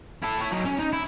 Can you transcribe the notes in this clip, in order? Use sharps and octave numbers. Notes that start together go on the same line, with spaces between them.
E4 A4
E4 C#5
F#3 D#4
C#4
D#4
E4